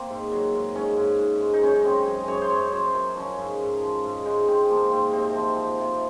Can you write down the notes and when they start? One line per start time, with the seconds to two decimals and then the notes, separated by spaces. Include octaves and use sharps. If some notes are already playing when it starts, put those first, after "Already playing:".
Already playing: A#3 C4
0.10 G#2
0.32 F#3
0.54 G#2
0.74 G#2 C#4
0.97 G#2
1.19 G#2
1.41 G#2
1.54 D#4
1.62 F#2 C#4
1.85 F#2 C4
2.06 F#2 G#4
2.28 F#2 C#5
2.42 C5
2.50 F#2 C#5
2.72 F#2 C5
2.94 F#2 A#4
3.16 F3 C#4
3.38 G#2
3.59 G#2
3.82 F3
4.04 G#2
4.26 G#3 D#4
4.48 G#2 C4
4.69 F3 A#3
4.91 G#2 C4
5.13 C3 C4
5.36 F3
5.57 F3
5.79 C3